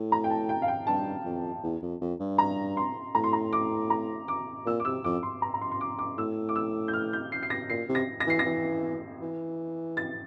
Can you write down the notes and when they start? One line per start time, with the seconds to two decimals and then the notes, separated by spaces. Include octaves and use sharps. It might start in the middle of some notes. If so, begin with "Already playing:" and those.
Already playing: A2
0.12 A#5
0.24 G5
0.30 A5
0.49 G5
0.62 F5
0.68 G5
0.87 G2 A5
1.25 F2
1.63 E2
1.82 F2
2.01 F2
2.20 G2
2.38 A#5
2.77 C6
3.15 A2 A#5
3.24 C6
3.33 A#5
3.53 D6
3.90 A#5
4.28 D6
4.66 A#2 E6
4.80 D6
4.85 C3 E6
5.04 F2 D6
5.23 C6
5.42 A#5
5.54 A#5
5.61 C6
5.71 C6
5.81 D6
5.99 D6
6.18 A2 E6
6.49 D6
6.56 E6
6.88 G6
6.93 F6
7.13 G6
7.32 C7
7.43 C7
7.50 A#6
7.70 A#2 C7
7.89 C3
7.95 A#6
8.20 A#6
8.27 E3 C7
8.39 A#6
8.46 E3
9.22 E3
9.97 A6